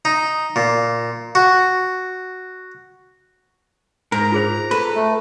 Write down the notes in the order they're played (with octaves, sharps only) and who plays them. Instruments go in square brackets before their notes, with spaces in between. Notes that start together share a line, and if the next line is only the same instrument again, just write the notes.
[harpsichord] D#4
A#2
F#4
[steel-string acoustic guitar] G#2 [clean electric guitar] A#4 [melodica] A#5
[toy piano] F4 G#4 C5
[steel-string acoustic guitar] A4 [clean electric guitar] B4
[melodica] A3